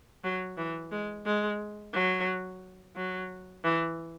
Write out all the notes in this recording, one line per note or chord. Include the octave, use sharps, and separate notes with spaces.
F#3
E3
G#3
G#3
F#3
F#3
E3